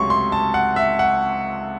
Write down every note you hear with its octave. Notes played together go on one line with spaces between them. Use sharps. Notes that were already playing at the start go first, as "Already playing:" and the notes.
Already playing: C#2 C3 F#3 A3 C#4 C6 C#6
C6
A5
F#5
E5
F#5